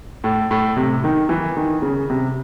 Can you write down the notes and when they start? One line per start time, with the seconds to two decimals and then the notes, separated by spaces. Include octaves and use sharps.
0.24 A2
0.51 A2
0.77 C3
1.04 D#3
1.29 E3
1.57 D#3
1.82 C#3
2.10 C3